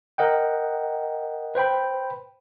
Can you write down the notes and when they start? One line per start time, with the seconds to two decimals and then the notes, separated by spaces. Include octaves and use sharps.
0.18 A#4 D#5 F#5 G5
1.55 B4 C5 G5 B5